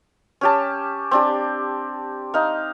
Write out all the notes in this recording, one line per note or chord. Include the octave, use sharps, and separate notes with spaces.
C#4 G4 A5
C4 D4 G4
D#4 F5